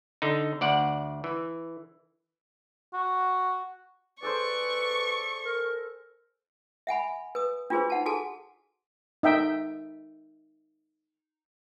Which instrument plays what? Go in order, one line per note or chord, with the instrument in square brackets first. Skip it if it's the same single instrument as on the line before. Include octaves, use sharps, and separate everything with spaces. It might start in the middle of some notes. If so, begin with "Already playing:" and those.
[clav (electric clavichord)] D3 D#4
D2 D5 F#5
E3
[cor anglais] F#4
[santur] G#4 A4 C5 [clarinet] B4 [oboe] D5 [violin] C#6
[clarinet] A#4
[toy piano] E5 F#5 G#5 B5
B4 D#6
D4 F4 F#4 G#4 B4 C5
D#4 F#5 A5
F#4 G#4 A4 G#5 A5
[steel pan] D#4 E5 G5